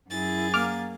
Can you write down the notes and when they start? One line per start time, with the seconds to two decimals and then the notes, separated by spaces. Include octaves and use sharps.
0.11 F#2 E4 G#4 A6
0.54 A#3 D6 F6